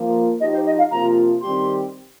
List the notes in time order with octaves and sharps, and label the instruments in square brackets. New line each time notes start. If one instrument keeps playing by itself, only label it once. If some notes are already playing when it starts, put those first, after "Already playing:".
Already playing: [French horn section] F3 A#3 F4
[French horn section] F3 D#4 G4 [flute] D#5
[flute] C5
D#5
F5
[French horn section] C3 F3 A#3 F4 [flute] A#5
[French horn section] D#3 G3 C4 G4 [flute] C6